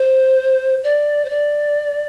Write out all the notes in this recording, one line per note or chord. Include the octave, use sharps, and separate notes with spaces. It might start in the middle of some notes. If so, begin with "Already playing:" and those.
Already playing: C5
D5
C5
D5